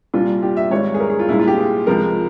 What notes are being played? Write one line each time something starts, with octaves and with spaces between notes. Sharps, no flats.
C2 A#2 G3 F4
G4
E5
G#1 G#2 G3 C#5
G#4
A#4
G#4
F4
C2 A#2 G#3 E4
F4
G4
G#4
C#2 C3 F3 G#3 A#4